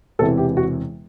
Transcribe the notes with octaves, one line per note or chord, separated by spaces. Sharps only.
E1 E2 C3 E3 A4
G4
F#4